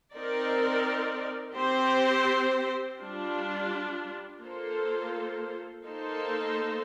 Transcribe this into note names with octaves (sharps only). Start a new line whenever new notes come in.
C4 D#4 A#4 D5
C4 G4 C5
G3 D4 F4
A#3 F4 A4 C5
A#3 D#4 A4 C5